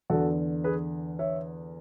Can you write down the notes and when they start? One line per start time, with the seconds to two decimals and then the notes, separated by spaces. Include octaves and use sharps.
0.10 E2 D3 F#4 A4
0.64 G#4 B4
1.19 C#5 E5